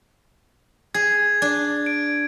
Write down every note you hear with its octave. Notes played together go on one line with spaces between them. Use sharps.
G#4 G#6
D4
D7